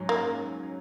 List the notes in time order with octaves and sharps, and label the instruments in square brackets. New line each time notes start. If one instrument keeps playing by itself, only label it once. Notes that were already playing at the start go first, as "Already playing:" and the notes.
Already playing: [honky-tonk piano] G#2 F#3 C#4
[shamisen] A#3